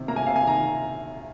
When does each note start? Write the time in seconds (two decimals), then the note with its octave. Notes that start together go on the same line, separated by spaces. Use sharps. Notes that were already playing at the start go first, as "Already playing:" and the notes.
Already playing: C3 D#3
0.08 A#3 A#5
0.16 G#5
0.26 C3 F5
0.36 G#5
0.47 D#3 A#5